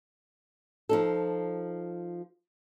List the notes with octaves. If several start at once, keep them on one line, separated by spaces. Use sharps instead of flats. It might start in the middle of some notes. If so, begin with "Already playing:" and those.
F3 D#4 A4